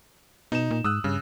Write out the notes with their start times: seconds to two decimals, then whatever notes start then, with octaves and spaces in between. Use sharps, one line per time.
0.52 B2 D#4 E7
0.71 A#2
0.84 G#2 D#6 E6 F#6
1.04 G2 C#3